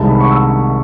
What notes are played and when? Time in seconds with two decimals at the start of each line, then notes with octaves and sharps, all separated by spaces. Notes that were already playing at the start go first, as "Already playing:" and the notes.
Already playing: C2 C3 D#3 G#3 A5
0.09 B5
0.20 C#6
0.31 E6